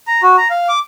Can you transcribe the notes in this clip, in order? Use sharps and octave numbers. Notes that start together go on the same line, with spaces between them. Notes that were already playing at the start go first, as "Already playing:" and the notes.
A#5
F#4
A#5
F5
D6